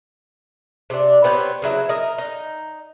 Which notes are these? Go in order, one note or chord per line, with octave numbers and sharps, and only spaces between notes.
C3 D4
B3 C4 G4 C#5
C#3 F#3 E4
A#4 D#5
D#4